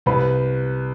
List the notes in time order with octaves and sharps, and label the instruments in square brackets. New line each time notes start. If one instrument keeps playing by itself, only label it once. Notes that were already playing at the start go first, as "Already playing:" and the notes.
[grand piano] C2 [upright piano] B4